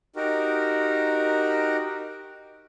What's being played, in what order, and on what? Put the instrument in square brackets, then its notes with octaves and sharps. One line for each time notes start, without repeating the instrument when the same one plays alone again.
[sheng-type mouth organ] D#4 F#4 G4 A#4